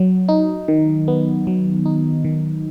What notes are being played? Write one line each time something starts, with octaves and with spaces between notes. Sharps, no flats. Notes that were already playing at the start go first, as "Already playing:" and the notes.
Already playing: F#3
D#4
D#3
B3
F#3
D#4
D#3